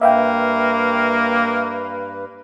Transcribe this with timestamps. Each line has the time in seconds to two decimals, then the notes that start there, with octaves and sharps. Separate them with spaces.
0.01 G2 A#3 B4 E5 F5 G5